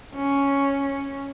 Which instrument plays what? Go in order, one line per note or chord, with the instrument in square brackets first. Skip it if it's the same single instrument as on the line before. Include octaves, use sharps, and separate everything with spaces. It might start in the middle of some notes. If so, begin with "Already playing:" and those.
[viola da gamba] C#4